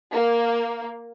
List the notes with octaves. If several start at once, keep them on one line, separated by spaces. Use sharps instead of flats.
A#3